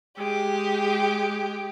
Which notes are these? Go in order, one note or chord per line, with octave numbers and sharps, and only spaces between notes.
G#3 G4